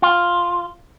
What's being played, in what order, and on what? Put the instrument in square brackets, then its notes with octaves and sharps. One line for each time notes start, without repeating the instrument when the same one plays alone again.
[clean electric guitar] F4